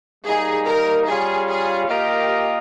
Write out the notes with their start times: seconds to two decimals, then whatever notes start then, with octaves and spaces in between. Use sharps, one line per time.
0.25 G3 A#3 D#4 G#4
0.66 A#4
1.06 G3 C#4 F4 G#4
1.48 G#4
1.89 A#3 F4 G4 A#4 D#5